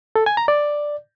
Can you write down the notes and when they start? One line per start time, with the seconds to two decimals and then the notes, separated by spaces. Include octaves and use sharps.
0.16 A4
0.26 G#5
0.37 A#5
0.48 D5